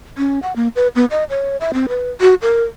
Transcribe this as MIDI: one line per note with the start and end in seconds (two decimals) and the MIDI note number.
0.18 0.39 61
0.42 0.55 78
0.56 0.68 58
0.76 0.88 71
0.95 1.05 59
1.11 1.24 75
1.30 1.57 73
1.61 1.71 76
1.74 1.86 60
1.89 2.10 71
2.21 2.34 66
2.42 2.63 70